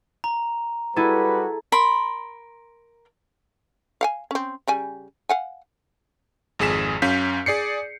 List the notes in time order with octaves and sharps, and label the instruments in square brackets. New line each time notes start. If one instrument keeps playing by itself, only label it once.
[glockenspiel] A#5
[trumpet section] G3 F#4 B4 [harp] E4 G#4 A4
[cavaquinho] A#4 B5 C6
[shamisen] F5 F#5 G#5
C4 C#4
C#3 G3 G#5
F5 F#5 G#5
[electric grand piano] G#1 F2 G#4 B6 E7
F#2 C#4 F5 G6 B6
G#4 D5 C7 C#7